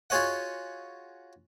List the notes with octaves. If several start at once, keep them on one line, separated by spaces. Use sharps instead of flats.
F4 F#4 G#4 C#5 D#5 F#5